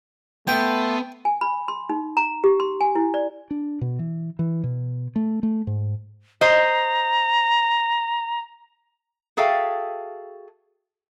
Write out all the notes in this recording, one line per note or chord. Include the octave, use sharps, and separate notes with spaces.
A3 B3 A4 G5 A5 C6
G#5
B5
C6
D#4
A#5
G4
C6
G#5
E4
D5
D4
B2
E3
E3
B2
A3
A3
G#2
C5 D#5 A#5
F#4 G#4 A4 E5 F5 G5